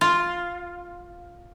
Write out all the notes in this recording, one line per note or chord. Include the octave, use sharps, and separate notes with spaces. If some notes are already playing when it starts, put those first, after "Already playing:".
F4